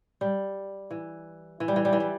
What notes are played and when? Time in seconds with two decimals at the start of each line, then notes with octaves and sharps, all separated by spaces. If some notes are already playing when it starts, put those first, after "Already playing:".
0.21 G3
0.91 E3
1.60 E3
1.68 G3
1.76 E3
1.85 G3
1.93 E3
2.00 G3